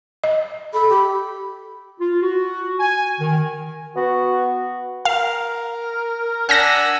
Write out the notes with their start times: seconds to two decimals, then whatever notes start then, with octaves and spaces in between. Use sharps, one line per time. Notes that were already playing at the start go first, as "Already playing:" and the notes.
0.24 D#5
0.73 A4 B5
0.89 G4
1.99 F4
2.21 F#4
2.80 G#5
3.19 D#3
3.96 B3 F#4
5.05 A#4 F5
6.49 D4 F#5 G#5 E6 F6 G6 A#6